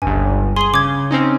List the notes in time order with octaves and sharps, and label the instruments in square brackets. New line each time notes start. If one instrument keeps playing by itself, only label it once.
[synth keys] G1 C#2 G2 [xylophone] G#5
[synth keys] G#4 [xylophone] C6 G7
[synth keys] C#3 [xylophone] D6 G#6
[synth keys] C4 C#4 D#4